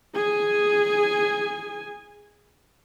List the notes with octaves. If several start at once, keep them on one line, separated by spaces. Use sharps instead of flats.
G#4 G#5